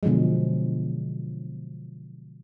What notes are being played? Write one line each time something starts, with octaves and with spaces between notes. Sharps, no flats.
B2 D3 F3 F#3 G#3